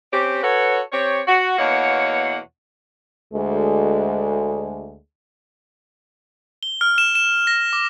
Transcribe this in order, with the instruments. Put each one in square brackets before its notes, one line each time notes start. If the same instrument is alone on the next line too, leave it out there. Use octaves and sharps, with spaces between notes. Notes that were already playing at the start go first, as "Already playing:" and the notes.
[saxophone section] C4 C#4 G4
F#4 A4 B4 C#5
C4 G4 C#5
F#4
E2 B2 A#3 C#5 F#5
[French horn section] D2 G#3
[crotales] G7
F6
E7
E7
A#6
D6